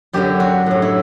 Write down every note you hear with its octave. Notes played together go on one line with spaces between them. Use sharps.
F#2 D3 F#3 G4
F#4
A2 F#3
E4